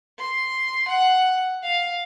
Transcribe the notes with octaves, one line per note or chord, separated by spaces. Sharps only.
C6
F#5
F5